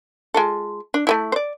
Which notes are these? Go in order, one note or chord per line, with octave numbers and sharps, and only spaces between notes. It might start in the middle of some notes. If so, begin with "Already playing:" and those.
G#3 F4 A4
D4
A3 A#3 E4
C5 D5